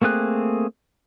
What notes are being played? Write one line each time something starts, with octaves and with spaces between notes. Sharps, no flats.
A3 A#3 C4 G#4 F#6